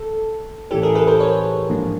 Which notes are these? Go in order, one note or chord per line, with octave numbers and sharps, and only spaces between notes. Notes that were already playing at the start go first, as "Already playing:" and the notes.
Already playing: A4
A2 E3 A3 C#4 E4 G4 A4
G#4 A#4
A4 B4
A#4 C5
B4 C#5
G#2 F3 A#3 D4